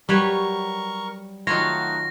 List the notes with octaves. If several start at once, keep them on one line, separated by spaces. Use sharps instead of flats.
F#3 G3 A#4 B4 C#5 C#6
D#3 F#3 A3 D#4 F4 F#4 C#5 A#6